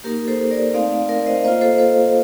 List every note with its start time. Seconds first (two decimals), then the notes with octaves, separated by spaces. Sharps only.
0.04 A#3 D#4 G4 A#4
0.28 A4 C5
0.51 A#4 D5
0.74 A3 C4 D#4 D5 F5
0.91 D5 F5
1.09 A#4 D5
1.26 C5 D#5
1.38 F5
1.44 A#3 C5 D#5
1.48 F4
1.61 A4 C5
1.78 A4 C5